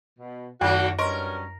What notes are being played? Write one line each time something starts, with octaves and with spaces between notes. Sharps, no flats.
B2
F#2 D#3 F#3 A3 F#4
G2 F#3 C#4 A#4 D#5 C6 C#6